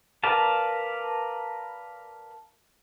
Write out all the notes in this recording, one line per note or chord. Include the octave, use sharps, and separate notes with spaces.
A#4 B4 D5 F5 A5